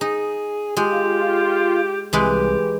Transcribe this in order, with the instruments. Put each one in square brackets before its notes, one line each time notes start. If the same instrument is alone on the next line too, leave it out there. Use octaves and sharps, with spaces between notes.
[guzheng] D#4 [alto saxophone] G#4
[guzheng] G#3 [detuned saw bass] F4 [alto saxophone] G4
[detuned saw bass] C2 [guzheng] E3 G#3 B4 [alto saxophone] G4